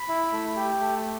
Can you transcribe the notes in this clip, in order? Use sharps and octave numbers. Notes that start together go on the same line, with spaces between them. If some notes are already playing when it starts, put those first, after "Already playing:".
Already playing: B5
E4
A3
G4
A3